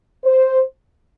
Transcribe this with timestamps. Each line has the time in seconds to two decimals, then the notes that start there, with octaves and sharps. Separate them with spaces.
0.24 C5